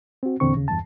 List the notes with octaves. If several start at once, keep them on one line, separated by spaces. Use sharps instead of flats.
C4 F#4
E2 A#2 D3 C4 C#6
D#2 C#3
E2 G2 A5